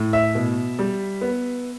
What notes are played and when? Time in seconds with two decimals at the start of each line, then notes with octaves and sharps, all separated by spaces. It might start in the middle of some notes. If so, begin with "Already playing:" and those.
Already playing: A2
0.13 E5
0.35 B2
0.79 G3
1.21 B3